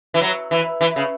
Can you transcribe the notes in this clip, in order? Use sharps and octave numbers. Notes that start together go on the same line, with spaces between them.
E3
F#3
E3
E3
C#3